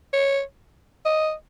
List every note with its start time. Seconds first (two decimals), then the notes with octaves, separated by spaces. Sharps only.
0.13 C#5
1.05 D#5